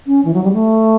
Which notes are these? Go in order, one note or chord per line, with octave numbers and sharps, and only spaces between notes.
C#4
E3
F#3
G3
A3